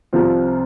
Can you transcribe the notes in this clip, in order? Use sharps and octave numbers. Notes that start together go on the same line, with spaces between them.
C2 C3 F3 C4 F4